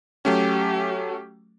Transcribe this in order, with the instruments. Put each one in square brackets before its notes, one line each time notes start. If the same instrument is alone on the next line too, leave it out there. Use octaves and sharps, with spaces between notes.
[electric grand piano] F#3 A3 C#4 [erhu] G4